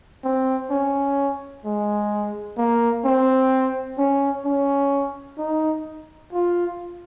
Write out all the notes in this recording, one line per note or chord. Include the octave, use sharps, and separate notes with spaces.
C4
C#4
G#3
A#3
C4
C#4
C#4
D#4
F4